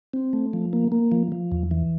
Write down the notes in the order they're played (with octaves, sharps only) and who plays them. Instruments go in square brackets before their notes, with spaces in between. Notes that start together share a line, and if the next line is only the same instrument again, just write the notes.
[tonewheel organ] C4
A3
F3
A#3
A#3
F3
F3
E2
E3